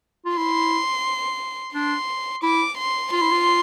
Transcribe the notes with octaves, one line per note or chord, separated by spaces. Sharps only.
F4
E4 C6
D4 C6
E4 D6
C6
F4 C6
E4
F4